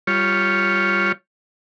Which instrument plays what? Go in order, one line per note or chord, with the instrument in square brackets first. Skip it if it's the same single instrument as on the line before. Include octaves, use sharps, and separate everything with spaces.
[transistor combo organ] G3 F4 C#5